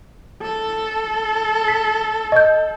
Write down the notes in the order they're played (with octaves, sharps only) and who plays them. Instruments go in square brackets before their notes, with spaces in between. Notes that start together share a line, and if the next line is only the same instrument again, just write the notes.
[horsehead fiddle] A4
[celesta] B6
D#5 G6